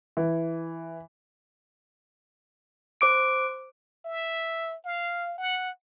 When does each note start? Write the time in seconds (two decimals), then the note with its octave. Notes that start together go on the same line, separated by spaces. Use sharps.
0.17 E3
3.01 C5 D6 D7
4.05 E5
4.85 F5
5.38 F#5